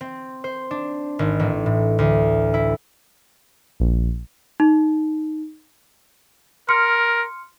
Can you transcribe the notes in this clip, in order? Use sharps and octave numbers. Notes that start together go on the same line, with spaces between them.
C4
C5
D4
G#1
A1
A2
D2
E4
A#1
D#4
A#4 C6 F6 C#7